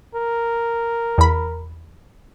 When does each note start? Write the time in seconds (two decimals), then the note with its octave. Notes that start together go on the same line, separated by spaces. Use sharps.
0.15 A#4
1.18 E2 B5